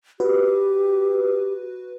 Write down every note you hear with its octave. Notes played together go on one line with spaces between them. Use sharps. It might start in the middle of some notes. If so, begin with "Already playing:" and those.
F#4 G4 B4